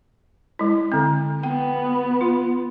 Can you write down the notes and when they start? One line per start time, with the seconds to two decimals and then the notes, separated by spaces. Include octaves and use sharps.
0.59 G#3 E4
0.92 D3 C4
1.43 B3 G5
2.21 F4